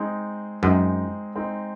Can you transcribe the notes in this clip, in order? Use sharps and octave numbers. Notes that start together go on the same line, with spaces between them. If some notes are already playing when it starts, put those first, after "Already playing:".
Already playing: G#3 C4 D#4
F#2 G#3 C4 D#4
G#3 C4 D#4